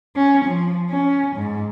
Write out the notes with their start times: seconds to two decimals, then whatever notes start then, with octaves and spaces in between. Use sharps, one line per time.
0.16 C#4
0.45 F3
0.90 C#4
1.36 G#2